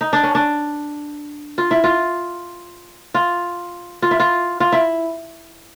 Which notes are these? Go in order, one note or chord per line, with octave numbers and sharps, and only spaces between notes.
D#4
D4
C#4
D4
F4
E4
F4
F4
F4
E4
F4
F4
E4